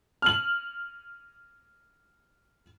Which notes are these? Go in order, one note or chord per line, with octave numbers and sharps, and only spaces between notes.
F6 F#7